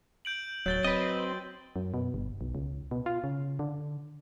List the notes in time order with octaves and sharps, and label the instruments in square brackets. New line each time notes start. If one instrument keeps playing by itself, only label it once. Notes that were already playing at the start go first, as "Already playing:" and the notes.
[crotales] G6 D7 F#7
[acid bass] D1 [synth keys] F#3 [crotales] G6 A6 G7
[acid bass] C4 [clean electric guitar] B4 D#5
[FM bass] F#2
B2
G1
B1
C#2
B2
F4
C#3
D3